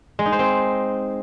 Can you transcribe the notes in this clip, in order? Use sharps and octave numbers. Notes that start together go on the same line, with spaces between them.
G#3
D#4
C5
C4